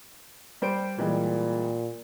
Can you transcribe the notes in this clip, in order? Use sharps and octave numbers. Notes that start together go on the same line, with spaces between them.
G3 C5 D7
A#2 E3 G3 G#3